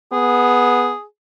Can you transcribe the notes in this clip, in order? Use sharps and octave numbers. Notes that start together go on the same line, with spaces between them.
B3 G#4